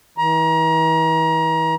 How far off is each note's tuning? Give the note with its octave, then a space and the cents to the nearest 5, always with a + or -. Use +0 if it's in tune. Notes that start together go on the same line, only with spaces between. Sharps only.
E3 -40 A#5 +30